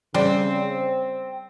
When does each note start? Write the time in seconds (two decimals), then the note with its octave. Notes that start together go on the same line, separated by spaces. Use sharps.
0.15 C#3 G3 C4
0.71 C5